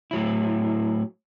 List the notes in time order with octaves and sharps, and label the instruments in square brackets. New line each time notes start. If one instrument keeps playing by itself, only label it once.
[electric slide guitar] A2 F#3 E4